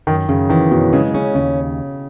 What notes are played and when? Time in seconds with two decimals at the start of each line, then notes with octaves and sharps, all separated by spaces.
0.07 F#2 D#3
0.29 F#2 C#3
0.49 D#3 E3
0.71 F#2 B2
0.93 C#3 G#3
1.14 C#3 C#4
1.35 D#2 C#3